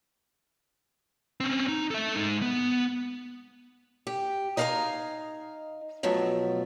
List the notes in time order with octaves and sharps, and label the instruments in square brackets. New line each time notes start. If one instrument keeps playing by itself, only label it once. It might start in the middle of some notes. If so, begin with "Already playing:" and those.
[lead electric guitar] C4 C#4
D#4
A4 E5
G#3 D#4
B3
[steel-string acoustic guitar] G4
D#4 D#5 F5 F#5 G#5 A#5
B2 F3 F#3 A3